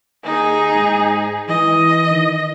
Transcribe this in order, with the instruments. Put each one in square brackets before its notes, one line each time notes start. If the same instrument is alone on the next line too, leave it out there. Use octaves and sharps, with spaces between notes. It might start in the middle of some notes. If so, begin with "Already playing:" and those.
[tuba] D#2 [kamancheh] D#4 G#4
[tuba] G#2
[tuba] E3 [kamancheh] D#5
[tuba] D#3